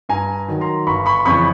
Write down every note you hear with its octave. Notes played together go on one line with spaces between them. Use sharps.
G2 G#5 A#5
D#3 F#3
A#5 C6
G1 B5 C#6
B5 C#6
F2 C#3 E3 B5 C#6